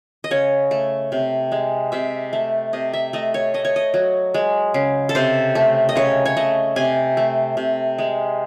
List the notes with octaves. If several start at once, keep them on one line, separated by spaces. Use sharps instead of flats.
D#5
C#3 C#5
A3
C3
G#3
C3 E5
A3
C3 D#5
E5
A3 D#5
C#5
A3 D#5
C#5
D#5
F#3
G#3
C#3
A4
C3 C5
A3
D#5
C#3 C#5
C#5
A3 D#5
C3 G#5
A3
C3
G#3